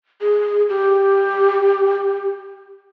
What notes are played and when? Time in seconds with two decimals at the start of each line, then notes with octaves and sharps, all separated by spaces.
0.21 G#4
0.69 G4